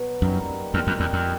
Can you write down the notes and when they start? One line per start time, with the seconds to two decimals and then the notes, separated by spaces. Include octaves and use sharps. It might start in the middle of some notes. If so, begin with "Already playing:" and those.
Already playing: B2 F#3 B3
0.22 F#2 G3 A#3 D#4 F#4
0.74 E2 D#3 G3 C4
0.87 F2
1.00 E2
1.13 F2